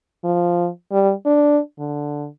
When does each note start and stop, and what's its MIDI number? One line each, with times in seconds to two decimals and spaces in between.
0.24 0.69 53
0.92 1.13 55
1.26 1.59 62
1.79 2.27 50